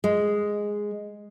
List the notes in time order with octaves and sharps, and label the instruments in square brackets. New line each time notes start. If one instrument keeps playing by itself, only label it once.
[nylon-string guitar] G#3